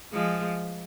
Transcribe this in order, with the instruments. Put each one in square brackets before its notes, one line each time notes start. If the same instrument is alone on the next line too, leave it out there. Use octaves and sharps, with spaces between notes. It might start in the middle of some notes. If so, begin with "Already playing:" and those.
[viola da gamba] F3 G#3